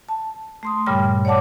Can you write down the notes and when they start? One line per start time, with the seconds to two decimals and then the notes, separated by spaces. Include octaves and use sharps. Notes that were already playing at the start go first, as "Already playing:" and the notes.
0.09 A5
0.63 A3 C6 D#6
0.86 G2 A#2 C#3 G3 G5 F6
1.25 C#5 D5 F#5 A5 D6